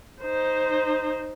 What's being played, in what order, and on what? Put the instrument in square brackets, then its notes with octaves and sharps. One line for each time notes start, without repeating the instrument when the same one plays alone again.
[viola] D#4 C5